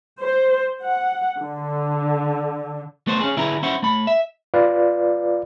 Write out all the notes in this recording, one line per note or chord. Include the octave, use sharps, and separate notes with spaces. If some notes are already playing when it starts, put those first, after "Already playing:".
C5
F#5
D3
A3 B3 A4 C5
C#4 G#4
D3 E4 G#4 B4 A#5
C#4 E4 C5 F#5
A3 B5
E5
F4 B4 D5 F5